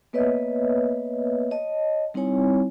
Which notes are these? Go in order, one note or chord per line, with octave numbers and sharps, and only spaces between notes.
A#3 B3 B4 C#5 D#5 E5
C#5 D#5 A5
G3 C4 D#4 E4 C#5 G#5